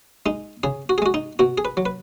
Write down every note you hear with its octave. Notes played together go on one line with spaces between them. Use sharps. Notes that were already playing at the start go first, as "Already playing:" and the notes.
G#3 D#4
C#3 G#4
F#4
G#4
G#3 F#4
D#4
B2 F#4
G#4
B4
F#3
B4